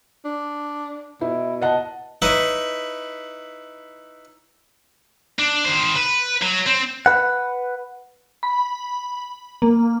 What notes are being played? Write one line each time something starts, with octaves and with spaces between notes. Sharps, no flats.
D4
B2 E4
D#5 F#5 A5
D#4 E4 B4 C#5
D4
D#3 C5
B4
F#3
C4
B4 F#5
B5
A#3